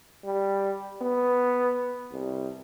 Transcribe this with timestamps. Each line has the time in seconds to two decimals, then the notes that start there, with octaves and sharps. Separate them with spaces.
0.25 G3
1.02 B3
2.12 C2